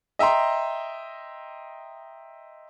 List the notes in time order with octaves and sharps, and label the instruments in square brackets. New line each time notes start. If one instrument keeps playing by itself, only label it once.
[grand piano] D#5 E5 G5 A#5 C6